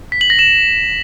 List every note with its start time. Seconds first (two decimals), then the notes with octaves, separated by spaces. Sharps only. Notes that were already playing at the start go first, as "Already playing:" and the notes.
0.12 B6
0.21 F#7
0.30 A#6
0.39 E7